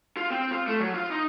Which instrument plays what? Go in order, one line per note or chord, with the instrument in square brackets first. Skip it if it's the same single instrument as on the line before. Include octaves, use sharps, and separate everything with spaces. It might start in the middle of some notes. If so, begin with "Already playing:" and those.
[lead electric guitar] F4
C4
F4
A3
F#3
F4
D#4